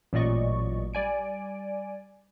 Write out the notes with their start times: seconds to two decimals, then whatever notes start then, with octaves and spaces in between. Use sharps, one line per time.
0.13 A1 A#2 F#3 D5 D#5 C#6
0.94 G3 D5 G#5 D7